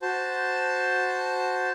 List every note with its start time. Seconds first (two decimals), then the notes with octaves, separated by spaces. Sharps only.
0.02 F#4 C5 A5